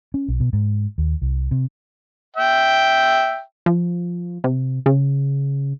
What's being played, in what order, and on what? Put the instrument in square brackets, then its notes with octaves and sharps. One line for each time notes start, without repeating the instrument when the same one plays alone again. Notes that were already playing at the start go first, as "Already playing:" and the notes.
[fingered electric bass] C#4
B1
B2
G#2
D#2
C2
C3
[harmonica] E5 G5
[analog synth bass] F3
C3
C#3